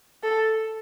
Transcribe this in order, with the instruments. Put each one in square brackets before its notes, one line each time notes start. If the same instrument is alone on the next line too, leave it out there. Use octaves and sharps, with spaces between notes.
[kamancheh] A4